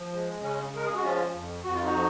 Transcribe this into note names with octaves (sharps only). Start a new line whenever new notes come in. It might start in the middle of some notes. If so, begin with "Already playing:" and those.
Already playing: F3
G#3
C#3 C#4
G#3 A#4
G#4
F#4
F3 C#4 F4
F2
F2 F#4
F4
D#4 F#4
F3